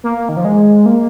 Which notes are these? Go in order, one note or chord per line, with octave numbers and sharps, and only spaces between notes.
A#3
D#3
F3
G#3
A#3